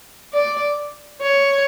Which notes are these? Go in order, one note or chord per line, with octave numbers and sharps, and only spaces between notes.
D5
C#5